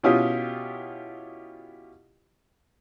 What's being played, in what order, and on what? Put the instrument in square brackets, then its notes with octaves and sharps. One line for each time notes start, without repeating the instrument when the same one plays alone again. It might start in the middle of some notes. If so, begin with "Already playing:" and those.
[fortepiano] B2 C#4 E4 F4 G4 D#6